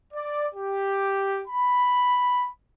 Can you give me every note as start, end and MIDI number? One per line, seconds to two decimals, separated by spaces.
0.14 0.47 74
0.54 1.41 67
1.48 2.48 83